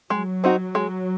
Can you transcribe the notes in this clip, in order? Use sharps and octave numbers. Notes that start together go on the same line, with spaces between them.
F#3 G#3
C4 D#4 F#4
G#3